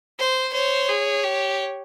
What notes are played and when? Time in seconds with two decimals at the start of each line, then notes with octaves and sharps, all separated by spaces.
0.20 C5
0.54 C5 C#5
0.89 G#4
1.24 G4